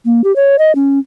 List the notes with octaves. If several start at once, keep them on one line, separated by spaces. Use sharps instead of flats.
A#3
G4
C#5
D#5
C#4